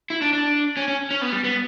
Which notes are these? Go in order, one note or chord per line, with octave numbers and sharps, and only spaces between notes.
E4
D4
D4
C#4
C#4
C#4
B3
G3
B3